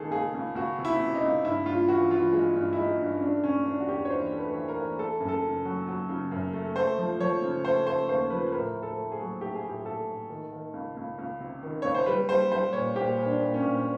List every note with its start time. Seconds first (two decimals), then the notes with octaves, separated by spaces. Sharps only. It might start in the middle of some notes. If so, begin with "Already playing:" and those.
Already playing: C#2 D#3 G#4 A4
0.11 C#2 G#4
0.34 C#2
0.55 C#2 F#4
0.78 C3
0.85 E4
1.00 C3
1.15 D#4
1.22 C#2
1.44 G2 E4
1.66 G2 F4
1.88 E3 F#4
2.10 E3 F4
2.33 G#3
2.56 G2
2.73 E4
2.76 G#3 D#4
2.99 G2
3.16 C#4
3.22 A3 D4
3.44 C3 C#4
3.65 E3 D4
3.80 F#4
3.88 E2 G4
4.05 C#5
4.10 E3 C5
4.32 A3
4.39 B4
4.54 E3
4.68 A#4
4.76 E3
4.98 A3 A4
5.20 F#2
5.28 A4
5.42 C#3
5.65 F#3
5.87 F#3
6.09 C#3
6.32 F#2
6.53 A3
6.76 A3 C5
6.98 F3
7.20 F3 C#5
7.42 C#3
7.65 A3 C5
7.86 A3 C5
8.09 D#2 C5
8.30 F3 B4
8.47 B4
8.52 A2 A#4
8.74 A2
8.83 A4
8.96 A3
9.12 G#4
9.20 F#3
9.41 A3 G4
9.55 G#4
9.63 A2
9.69 G4
9.85 A2 A4
10.07 A2
10.29 D#3
10.52 D#3
10.73 C#2
10.97 C#2
11.18 C#2
11.40 C3
11.63 D#3
11.82 C#2 C#5
11.94 C5
12.06 G3 B4
12.29 G3 C5
12.52 G3 C5
12.73 A#2 C#5
12.96 A#2 G4
13.17 A#2
13.26 D4
13.40 A#2
13.54 C#4
13.62 A#2